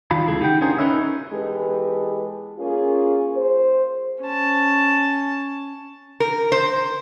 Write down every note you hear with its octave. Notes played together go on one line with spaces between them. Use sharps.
D#3 G3 F4 F5 B5
C#2 E4 G#4 A4
D#4 G4 F#5 G5
C#4 D4 F4 G#4 A#4 C5
C#4 D#4 A#4 B4 C#5 E5
E2 G#3 G4 A4 B4
A#3 C#4 F4 G#4
C5
C#4 A5
A#4
C5